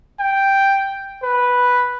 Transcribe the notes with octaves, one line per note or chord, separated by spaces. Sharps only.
G5
B4